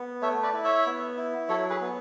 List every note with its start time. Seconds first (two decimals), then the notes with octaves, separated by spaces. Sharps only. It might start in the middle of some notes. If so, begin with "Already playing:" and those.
Already playing: B3
0.22 A3 C#5 E5
0.43 B4 D5
0.53 E4
0.64 C#5 E5
0.86 B3
1.17 E4
1.48 F#3 A4 C#5
1.70 G#4 B4
1.81 B3